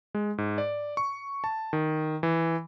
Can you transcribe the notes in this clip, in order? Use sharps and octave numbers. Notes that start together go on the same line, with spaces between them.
G#3
G#2
D5
C#6
A5
D#3
E3